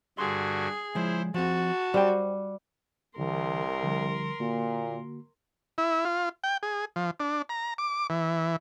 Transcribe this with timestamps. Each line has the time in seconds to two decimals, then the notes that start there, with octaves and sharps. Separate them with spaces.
0.18 G2 D3 F#4 G#4 C6
0.95 F3 G#3 E4 C5
1.34 F3 C4 F#4 A5
1.94 G3 C5 G5
3.18 C2 D3 E3 A#4 C6
3.83 D3 F3 G3
4.40 A#2 D3 A#3 F#4
5.78 E4
6.05 F4
6.44 G5
6.63 G#4
6.96 F3
7.20 D4
7.49 A#5
7.78 D6
8.10 E3